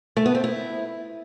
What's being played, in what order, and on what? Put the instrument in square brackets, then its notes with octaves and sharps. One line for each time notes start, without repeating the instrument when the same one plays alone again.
[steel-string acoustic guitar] A3
B3
C4
E4